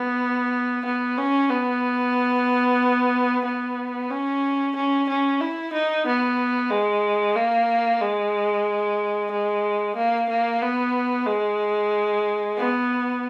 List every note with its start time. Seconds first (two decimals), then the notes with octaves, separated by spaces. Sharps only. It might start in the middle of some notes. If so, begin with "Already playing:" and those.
Already playing: B3
0.85 B3
1.18 C#4
1.50 B3
3.45 B3
4.10 C#4
4.76 C#4
5.09 C#4
5.41 E4
5.73 D#4
6.06 B3
6.71 G#3
7.36 A#3
8.01 G#3
9.31 G#3
9.96 A#3
10.29 A#3
10.62 B3
11.26 G#3
12.57 B3